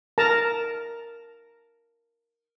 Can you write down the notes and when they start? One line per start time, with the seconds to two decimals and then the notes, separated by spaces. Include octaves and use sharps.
0.18 A#4 A5 A#5